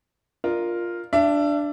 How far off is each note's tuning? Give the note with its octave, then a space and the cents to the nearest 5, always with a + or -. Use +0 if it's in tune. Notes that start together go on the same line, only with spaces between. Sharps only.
F4 +0 A#4 +0 D5 +40
D4 +0 E5 +35